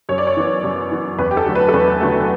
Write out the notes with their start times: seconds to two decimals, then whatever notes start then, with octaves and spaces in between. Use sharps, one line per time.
0.09 F#2 C#5
0.18 D5
0.27 C#5
0.37 E3 B3
0.64 F#2
0.91 E3 B3
1.19 E2 B4
1.31 G4
1.37 A4
1.46 D3 F#3 A3
1.55 B4
1.69 A4
1.73 E2 B4
2.01 D3 F#3 A3